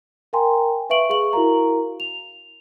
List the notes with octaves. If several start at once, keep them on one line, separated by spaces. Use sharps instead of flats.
A#4 F5 G5 G#5 A#5 C6
B4 E5 F5 C#6 D7 F#7
G#4 F5 C#6 F#7
E4 F#4 A#4 F5 A#5
F7